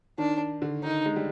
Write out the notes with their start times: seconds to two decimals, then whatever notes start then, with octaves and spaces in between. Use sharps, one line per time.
0.18 D#3 D4
0.62 D3
0.83 D#3 D#4
1.06 G#3
1.16 G3